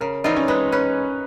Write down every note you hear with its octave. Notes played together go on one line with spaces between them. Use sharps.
C#3 A#4
E3 G3 C4 D#4 F4 D#5
C#4 C#5
G#3 B4
C#4 B4